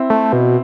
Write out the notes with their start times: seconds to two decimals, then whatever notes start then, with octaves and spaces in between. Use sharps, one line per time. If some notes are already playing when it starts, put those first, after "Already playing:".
Already playing: C4 E4
0.10 A3
0.33 B2